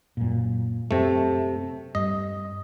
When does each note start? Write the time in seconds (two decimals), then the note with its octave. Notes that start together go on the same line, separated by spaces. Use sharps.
0.17 F#2 A#2
0.91 F#2 C3 A3
1.95 G2 D#5